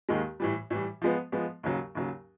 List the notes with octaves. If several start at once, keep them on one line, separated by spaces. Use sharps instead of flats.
D#2 D#3 G#3
A2 E3 G3
A2 E3 G3
F3 G#3 B3
F3 G#3 B3
D#2 C#3 F#3
D#2 C#3 F#3